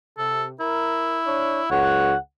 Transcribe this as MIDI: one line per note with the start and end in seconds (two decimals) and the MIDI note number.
0.18 0.53 48
0.18 0.45 69
0.60 1.70 64
0.60 1.18 70
1.25 1.61 62
1.25 1.61 73
1.71 2.13 37
1.71 2.13 73
1.71 2.16 78